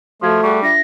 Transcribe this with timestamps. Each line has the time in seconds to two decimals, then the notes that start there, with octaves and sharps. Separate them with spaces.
0.22 F3 A3 F#4 F5 G#6
0.43 G3 F#4 G#4 C#6
0.62 D4 F4 E5 A#6